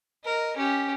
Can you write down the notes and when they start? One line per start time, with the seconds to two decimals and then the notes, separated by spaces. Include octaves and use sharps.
0.25 A#4 D#5
0.57 C#4 G4